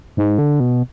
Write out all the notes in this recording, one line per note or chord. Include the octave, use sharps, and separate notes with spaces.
G#2
D3
B2